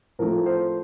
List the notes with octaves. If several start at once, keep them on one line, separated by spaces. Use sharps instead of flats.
A2 F3 A3 C4 A#4
C5